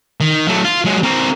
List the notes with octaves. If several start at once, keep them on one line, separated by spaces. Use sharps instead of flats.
D#3
F#3 A3
F4
F#3 G#3
C4 A#4